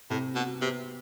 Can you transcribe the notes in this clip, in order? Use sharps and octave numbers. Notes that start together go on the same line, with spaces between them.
A2 C3
B2 F#4
C3 B3